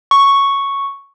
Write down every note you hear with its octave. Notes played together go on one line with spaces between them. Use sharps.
C#6